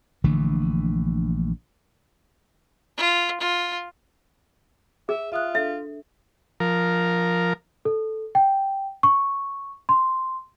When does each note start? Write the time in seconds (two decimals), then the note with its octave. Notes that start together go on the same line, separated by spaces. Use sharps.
0.24 A#1 D3 E3 A3
2.97 F4
3.40 F4
5.09 G#4 E5
5.32 F4 E5 D#6 F#6
5.55 D4 A4 E5
6.60 F3 A#4
7.85 A4
8.35 G5
9.03 C#6
9.89 C6